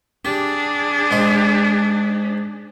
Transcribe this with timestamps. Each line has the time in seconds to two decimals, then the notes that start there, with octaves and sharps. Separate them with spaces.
0.25 D4 G4 G#4
1.11 G#2 D#5 C6